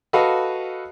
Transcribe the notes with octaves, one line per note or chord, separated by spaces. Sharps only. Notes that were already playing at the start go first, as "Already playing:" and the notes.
F#4 A4 B4 D#5 F5